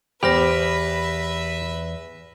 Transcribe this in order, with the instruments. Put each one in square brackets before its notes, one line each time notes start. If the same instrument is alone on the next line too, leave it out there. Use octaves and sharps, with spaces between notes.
[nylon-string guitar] E2 C5 [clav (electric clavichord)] G4 [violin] B4 E5 [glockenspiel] B5 F6 A#6